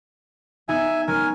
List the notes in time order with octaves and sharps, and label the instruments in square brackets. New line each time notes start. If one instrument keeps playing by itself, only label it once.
[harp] B3 D#4 G#4 [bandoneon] E5 G#5
[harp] G#3 C#4 [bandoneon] A#4 G#5